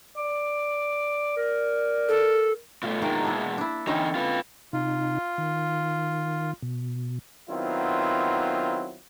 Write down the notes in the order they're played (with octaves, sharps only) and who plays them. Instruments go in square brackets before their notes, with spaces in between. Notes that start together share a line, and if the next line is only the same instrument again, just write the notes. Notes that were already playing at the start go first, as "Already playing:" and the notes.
[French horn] D5 [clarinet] D6
[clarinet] A#4
[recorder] A4
[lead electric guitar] B2 A3 [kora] F4
[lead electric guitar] B2 G#3 [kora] D#3 A#3 G5
[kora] D4 E4
D4 E4
[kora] D3 C4 C#4 [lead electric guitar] E3 D#4
[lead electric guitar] F4 B4
[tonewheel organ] C3 D#4 [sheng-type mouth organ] F4
[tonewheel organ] D#3
B2
[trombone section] D#3 F#3 B3 C4 E4 F4